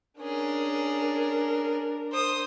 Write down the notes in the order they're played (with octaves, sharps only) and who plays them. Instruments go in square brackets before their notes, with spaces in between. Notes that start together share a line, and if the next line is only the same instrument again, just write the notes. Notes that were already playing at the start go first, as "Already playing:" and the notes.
[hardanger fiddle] C#4 G#4 [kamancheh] D4 A#4
[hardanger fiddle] C5 D#6